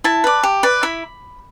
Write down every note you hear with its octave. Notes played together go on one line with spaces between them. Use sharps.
E4 A5
B4 D5
G4
B4 D5
E4 B5